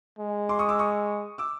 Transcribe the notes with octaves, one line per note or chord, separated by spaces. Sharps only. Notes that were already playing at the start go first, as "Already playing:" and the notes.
G#3
C6 D6
C#6 D#6
D6 E6
C#6 D#6
D6 E6